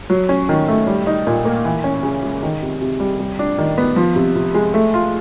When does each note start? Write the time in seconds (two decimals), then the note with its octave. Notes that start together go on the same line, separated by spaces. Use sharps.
0.10 F#3
0.29 C#4
0.49 D#3
0.68 A3
0.87 G3
1.07 D#4
1.27 A#2
1.45 A#3
1.65 E3
1.84 C#4
2.03 C#3
2.23 G#3
2.43 D#3
2.62 C3
2.81 C3
3.00 G3
3.19 G3
3.39 D4
3.58 D#3
3.78 B3
3.96 F3
4.16 C3
4.36 C3
4.55 G#3
4.74 A3
4.94 F4